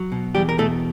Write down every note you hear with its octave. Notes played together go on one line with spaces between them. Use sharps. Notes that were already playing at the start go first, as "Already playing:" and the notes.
Already playing: F#3
B2
E2 G3 G4
A#4
B2 A3 A4